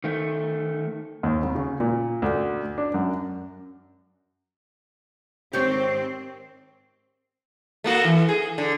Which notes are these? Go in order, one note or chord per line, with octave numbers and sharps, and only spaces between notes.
D#3 A3
D#2
C2
C#3
A#2
D2
D4
F#2
G#2 D#3 C4 G4 C5 C#5
A3 A#3 F#4
E3
G#4
D3